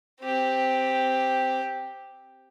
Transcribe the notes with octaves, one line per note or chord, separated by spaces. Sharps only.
C4 G4